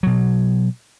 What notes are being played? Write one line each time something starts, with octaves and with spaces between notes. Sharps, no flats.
B2 F#3